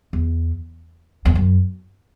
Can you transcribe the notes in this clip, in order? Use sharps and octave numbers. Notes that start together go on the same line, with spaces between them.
E2
E2
F#2